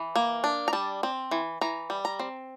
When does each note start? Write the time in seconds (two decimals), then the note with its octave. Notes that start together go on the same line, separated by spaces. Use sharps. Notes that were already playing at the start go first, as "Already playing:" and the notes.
Already playing: E3
0.16 A#3
0.44 D4
0.68 A#5
0.73 G3 A5
1.03 C4
1.31 E3
1.61 E3 A#5
1.90 G3
2.05 A#5
2.19 C4